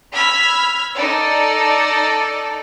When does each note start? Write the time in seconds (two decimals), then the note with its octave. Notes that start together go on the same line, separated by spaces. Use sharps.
0.12 B5 E6 F6 G#6 B6
0.95 D#4 A4 D5